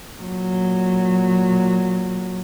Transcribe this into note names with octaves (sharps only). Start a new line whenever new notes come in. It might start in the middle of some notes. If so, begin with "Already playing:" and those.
A#2 F#3